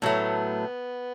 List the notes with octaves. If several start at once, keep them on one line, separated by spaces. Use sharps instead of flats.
A2 F#3 A3 B3